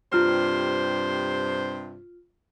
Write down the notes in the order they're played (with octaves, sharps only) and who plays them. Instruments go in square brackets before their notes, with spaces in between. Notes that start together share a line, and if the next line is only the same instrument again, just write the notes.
[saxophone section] G2 C3 C5 [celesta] F4 F6